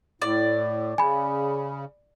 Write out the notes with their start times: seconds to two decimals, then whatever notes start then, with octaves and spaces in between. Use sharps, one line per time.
0.22 A2 D5
0.98 C#3 G#5 B5